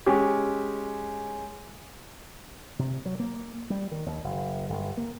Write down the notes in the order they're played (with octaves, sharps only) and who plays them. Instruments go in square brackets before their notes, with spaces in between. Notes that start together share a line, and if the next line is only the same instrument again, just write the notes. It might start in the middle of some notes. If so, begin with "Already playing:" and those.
[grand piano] G#3 C#4 G4
[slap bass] C3
F#3
A#3
G3
D#3
D#2
F#1
G1
A#3